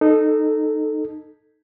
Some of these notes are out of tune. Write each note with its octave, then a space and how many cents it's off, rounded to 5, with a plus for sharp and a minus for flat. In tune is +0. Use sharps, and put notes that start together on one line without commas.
D#4 -15 A4 +0